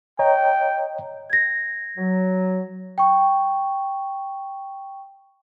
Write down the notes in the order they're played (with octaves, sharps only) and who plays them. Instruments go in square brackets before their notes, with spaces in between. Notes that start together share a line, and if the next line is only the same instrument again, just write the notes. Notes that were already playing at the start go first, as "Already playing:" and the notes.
[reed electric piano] C#5 D#5 A#5 [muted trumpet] G5
[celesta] G#6 A#6
[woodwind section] F#3
[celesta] G5 C#6